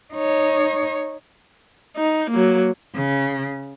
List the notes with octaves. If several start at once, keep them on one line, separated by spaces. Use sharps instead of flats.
D#4 C#5
D#4
F#3 A#3
C#3